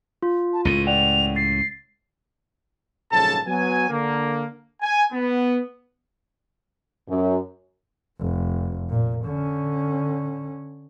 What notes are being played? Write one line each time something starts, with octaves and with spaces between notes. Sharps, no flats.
F4
A5
C#2 A2 D#7
D5 F#5 G5 F7
A6 C7
A#1 G#2 C#3 F#3 A4 A5
F#3 B3 G#5
D3 A#3
G#5
B3
F#2
F1
A#2
D3 C#4